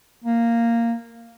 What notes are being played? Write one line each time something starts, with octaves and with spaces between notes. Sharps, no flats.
A#3